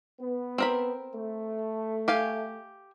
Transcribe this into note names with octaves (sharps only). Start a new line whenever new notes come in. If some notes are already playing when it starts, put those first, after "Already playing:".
B3
C4 A#4 B5
A3
G4 F5 G#5